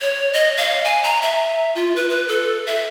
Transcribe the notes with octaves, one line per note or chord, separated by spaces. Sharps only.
C#5
D#5
F5
G#5
A#5
E5
F4
B4
B4
A4
E5